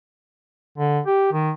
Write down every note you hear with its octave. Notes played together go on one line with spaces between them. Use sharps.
D3
G4
D#3